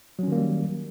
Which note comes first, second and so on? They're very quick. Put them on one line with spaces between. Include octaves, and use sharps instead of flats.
F#3 C#4 D#3 A#3 G3